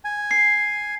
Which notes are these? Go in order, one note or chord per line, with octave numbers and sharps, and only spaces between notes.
G#5
C7